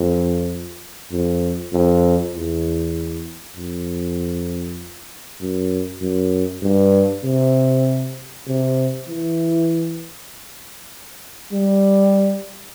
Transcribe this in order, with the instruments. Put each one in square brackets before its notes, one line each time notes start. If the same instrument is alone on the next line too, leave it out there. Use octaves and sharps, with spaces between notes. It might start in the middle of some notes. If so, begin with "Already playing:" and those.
Already playing: [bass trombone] F2
F2
F2
E2
F2
F#2
F#2
G2
C3
C3
E3
G3